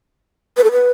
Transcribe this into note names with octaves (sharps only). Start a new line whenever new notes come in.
B4
A4
B4